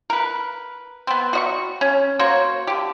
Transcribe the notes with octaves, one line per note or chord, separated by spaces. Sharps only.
A#4 B4
B3 C4
F#4 D#5 C#6
C#4
A#3 F#4 C5 C#5
D3 G4